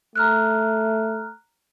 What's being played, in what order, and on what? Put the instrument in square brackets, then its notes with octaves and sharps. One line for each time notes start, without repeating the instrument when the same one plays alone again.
[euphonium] A3 [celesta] A#5 F6 F#6